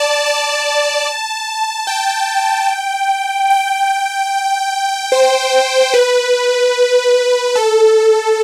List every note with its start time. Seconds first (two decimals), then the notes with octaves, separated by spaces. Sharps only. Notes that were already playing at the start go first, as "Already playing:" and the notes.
Already playing: D5 A5
0.26 A5
1.87 G5
3.50 G5
5.12 C5
5.94 B4
7.55 A4